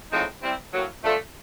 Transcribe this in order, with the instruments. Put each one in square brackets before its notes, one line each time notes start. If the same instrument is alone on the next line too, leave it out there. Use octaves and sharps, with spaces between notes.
[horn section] A2 F3 G#3 C4 D#4
G3 C4 E4
A2 F#3 A#3
F3 A3 D4